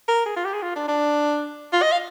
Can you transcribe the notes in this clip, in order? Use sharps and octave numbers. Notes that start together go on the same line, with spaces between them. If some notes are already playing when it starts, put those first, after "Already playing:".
A#4
G#4
F4
G4
G#4
F4
D4
D4
F4
D#5
F5